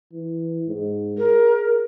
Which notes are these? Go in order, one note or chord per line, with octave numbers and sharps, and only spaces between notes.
E3
G#2
G#4 A#4